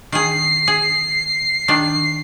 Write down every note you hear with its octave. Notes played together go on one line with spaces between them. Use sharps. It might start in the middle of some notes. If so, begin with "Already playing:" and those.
D#3 G#4 C7
G#4
D#3 D4